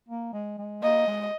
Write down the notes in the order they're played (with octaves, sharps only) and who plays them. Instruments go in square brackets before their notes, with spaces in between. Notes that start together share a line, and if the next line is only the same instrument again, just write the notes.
[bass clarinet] A#3
G#3
G#3
[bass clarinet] A#3 [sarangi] D#5
[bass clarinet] G#3